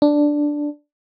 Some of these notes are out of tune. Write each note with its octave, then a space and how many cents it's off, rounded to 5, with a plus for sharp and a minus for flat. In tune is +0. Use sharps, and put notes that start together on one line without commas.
D4 +0